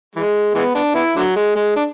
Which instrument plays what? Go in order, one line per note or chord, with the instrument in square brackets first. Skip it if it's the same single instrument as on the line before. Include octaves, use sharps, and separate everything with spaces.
[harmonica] E3 G#3
E3 G#3 B3
B3 D4
B3 E4
D3 F#3
G#3
G#3
D4